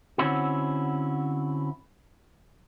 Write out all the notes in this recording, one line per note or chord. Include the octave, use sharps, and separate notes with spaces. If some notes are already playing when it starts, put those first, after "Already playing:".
D3 C4 C#4 E4 F#4